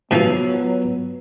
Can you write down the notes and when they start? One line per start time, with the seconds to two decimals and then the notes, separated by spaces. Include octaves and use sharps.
0.11 G#2 C3 F3 F#3 B3 F4 F#4 B4